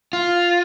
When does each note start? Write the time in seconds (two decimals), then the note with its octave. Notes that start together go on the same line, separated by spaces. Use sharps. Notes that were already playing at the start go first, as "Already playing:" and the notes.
0.13 F4